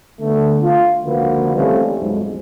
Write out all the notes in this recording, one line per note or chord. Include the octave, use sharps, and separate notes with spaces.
D3 A3 B3
F4
C#2 D3 F3 A#3 F#4 B4
E3 G3 A3 C4 C#4 F4
B1 F2 G#2